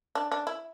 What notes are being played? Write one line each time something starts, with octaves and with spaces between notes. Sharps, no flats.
D4
D4
E4